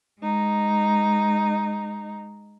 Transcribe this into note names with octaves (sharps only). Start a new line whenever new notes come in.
G#3 D#4